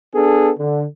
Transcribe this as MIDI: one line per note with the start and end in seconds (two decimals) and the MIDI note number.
0.15 0.52 59
0.15 0.52 62
0.15 0.52 68
0.15 0.52 69
0.59 0.85 50